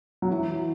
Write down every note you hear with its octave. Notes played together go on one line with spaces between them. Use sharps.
F#3
E3